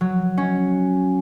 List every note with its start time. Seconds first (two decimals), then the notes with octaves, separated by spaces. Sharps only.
0.01 F#3
0.37 C#4